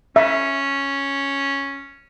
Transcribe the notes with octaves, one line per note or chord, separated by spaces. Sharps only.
C#4 E5